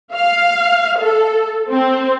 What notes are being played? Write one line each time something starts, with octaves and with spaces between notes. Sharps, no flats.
F5
A4
C4